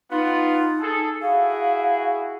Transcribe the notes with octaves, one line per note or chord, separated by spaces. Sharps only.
B3 D#4 F4
G#4 A4
E4 F#4 G#4 F5